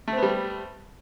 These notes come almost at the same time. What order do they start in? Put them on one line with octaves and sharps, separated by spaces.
A3 C4 B3 G3